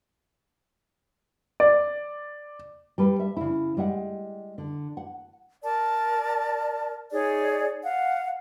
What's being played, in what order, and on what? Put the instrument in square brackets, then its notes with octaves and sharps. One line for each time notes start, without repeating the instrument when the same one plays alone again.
[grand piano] D5
[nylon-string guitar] G3 A4 B4
E5
C#3 E4
G3 G#3 E5 F#5
D3
F#5
[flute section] A#4 D5 A5
D#4 G#4 C#5 D5
F5 F#5